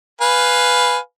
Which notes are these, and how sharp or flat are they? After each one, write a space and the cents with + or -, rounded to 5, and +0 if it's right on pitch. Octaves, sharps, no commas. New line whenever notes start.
B4 +5 F5 +5 G#5 +0